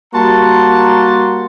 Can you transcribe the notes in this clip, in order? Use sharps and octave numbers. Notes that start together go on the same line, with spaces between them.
G3 A#3 F#4 A5 A#5 C6